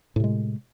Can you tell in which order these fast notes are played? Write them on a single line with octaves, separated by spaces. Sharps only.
A2 C3 G#3